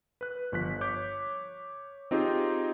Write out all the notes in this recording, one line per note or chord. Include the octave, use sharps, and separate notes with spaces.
B4 F#6
G1 F3 F#6 B6
C#5 D6 G6
C4 D#4 F4 G4 G#4